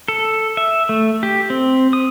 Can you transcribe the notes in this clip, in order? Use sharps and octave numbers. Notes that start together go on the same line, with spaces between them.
A4
E5
A3
G4
C4
D#6